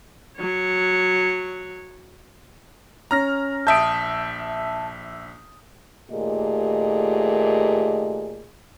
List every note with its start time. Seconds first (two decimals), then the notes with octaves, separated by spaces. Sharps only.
0.38 F#3 C#5
3.11 C#4 A#5 F6 A#6
3.67 A#1 E5 A5 D#6 G6 D7
6.10 D#2 A#2 A3 G4 G#4 D#5